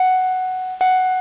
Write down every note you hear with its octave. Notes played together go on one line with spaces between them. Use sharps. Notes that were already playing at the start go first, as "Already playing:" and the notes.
Already playing: F#5
F#5